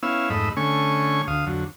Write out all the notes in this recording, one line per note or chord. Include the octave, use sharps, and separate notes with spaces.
B3 C#4 E4 F5 E6
F2 G#2 A3 D#5 B5 E6
D3 A3 C#4 G#5 C#6
D2 F5 D#6
F2 D3 F#3